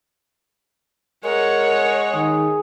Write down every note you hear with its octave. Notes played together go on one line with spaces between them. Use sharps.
G#3 A#4 C#5 F#5
D#3 G#4